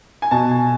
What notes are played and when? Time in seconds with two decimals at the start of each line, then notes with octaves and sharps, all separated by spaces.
0.22 G#5
0.31 B2 A5
0.51 G#5